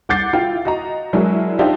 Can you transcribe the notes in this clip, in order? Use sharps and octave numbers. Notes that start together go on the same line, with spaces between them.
C2 F#5 D6 G6 A6 C7
E4 F4 F5 G5
F#4 D#5 A#5
F#3 G#3 D4 E4 F#4 A#4
D4 D#4 F4 G4 C5 E5